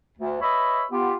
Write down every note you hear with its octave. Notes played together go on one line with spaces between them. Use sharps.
D2
B4 C#5 D#5 E5 B5
B3 F4 G4